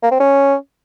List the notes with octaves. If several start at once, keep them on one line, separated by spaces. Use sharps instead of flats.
A#3
C4
C#4